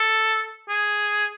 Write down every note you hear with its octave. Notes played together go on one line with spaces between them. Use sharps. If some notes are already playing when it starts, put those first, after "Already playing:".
Already playing: A4
G#4